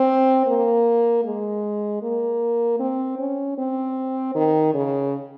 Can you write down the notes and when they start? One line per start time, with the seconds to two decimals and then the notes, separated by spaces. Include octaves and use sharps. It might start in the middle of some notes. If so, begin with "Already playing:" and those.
Already playing: C4
0.47 A#3
1.24 G#3
2.02 A#3
2.80 C4
3.19 C#4
3.58 C4
4.35 D#3
4.74 C#3